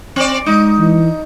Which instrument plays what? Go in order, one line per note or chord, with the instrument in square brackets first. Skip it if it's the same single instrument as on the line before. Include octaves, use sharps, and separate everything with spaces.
[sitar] C4 D5
[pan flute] G#3 [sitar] D#4
[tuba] E3